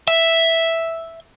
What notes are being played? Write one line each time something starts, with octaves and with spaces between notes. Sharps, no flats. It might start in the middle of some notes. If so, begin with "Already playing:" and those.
E5